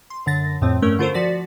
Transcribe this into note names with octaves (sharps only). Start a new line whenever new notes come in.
C6
F#2 D3 A6 A#6
F2 A2 F3 C4
G2 A3 C#4 A#4
D3 A3 F4 A4 A#4 C5
F3 F#4 D5 A6 B6